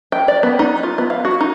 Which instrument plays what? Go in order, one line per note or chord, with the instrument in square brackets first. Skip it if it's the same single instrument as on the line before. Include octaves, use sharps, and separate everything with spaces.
[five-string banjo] G5
D5
B3
D#4
F4
B3
F5
F#4
D#4